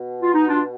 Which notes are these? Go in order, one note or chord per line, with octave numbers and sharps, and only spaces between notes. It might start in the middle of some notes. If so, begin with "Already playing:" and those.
Already playing: B2
F4
D#4
D4 F4